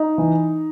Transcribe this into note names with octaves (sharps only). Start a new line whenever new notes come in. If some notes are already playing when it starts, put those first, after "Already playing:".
Already playing: D#4
E3